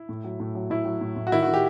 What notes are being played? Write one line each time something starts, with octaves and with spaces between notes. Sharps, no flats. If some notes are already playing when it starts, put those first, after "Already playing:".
Already playing: E4
A2
F#3
A2
F#3
A2 E4
F#3
A2
A2
F#4
D#3 E4
D#3 F#4
G4